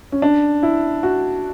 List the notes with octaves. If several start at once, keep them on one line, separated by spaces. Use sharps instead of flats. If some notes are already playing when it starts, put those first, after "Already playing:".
C#4
D4
E4
F#4